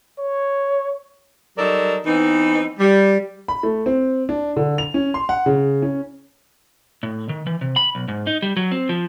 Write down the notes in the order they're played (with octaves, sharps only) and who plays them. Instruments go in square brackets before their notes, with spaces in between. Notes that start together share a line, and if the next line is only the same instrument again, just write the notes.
[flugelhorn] C#5
[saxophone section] F#3 G3 D#4 A4 A#4 D5
E3 B3 C4 D#4
G3
[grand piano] B5
A3
C4
D4
D3
F7
C#4
C6
F#5
C#3
C#4
[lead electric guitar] A2
D#3
E3
C3
B5
B1
G#2
D#4
G3
F#3
C4
F3